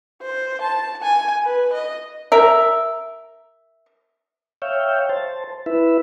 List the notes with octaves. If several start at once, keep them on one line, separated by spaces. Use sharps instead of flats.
C5
A5
G#5
B4
D#5
A#4 E5
C#5 E5 F5 G5
C5 A5
E4 B4 E5